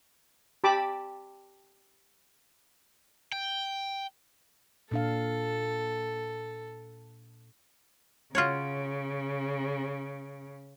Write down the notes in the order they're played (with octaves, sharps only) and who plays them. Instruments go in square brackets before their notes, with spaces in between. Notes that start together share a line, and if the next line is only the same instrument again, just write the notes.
[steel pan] G4 A5 B5 D6
[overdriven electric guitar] G5
[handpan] A#2 D4 F5 [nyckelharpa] A4
[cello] C#3 [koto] F4 F#4 C#5